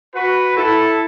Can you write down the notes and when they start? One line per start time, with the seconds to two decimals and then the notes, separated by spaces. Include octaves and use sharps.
0.15 F#4 B4
0.57 E4 A4